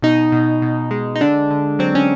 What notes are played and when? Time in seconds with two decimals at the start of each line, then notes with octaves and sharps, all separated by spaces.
0.02 B2 D#4
0.32 B2
0.62 B2
0.91 G#3
1.15 D#4
1.21 D3 D4
1.51 D3
1.79 F#3 C4
1.95 C#4